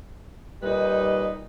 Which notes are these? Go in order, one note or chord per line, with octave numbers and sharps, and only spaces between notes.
A#2 G3 D#4 B4 D#5